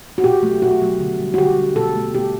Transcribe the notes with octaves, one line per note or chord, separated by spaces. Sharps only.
F#4
B2 G4
F#3 A3
B2 F#4
F#3 A3
D3
G3
F#4
D3 G4
G3
B2 A4
A3
B2 G4